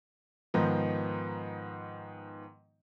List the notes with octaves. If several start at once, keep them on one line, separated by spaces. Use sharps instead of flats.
G#2 D#3 F3 B3 D#4